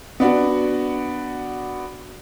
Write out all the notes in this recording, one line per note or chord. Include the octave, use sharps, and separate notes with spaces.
B3 D4 F#4